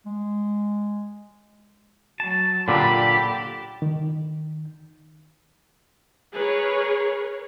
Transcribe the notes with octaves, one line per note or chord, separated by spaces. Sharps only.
G#3
F#3 A5
A#2 D3 D4 G4 B5
D#3
G#4 A#4 B4 C#5